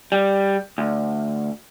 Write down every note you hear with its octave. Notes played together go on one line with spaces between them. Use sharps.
G3
D2